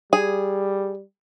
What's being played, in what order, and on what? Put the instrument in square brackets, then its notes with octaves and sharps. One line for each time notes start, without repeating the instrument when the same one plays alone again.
[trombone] G3 [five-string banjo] G#4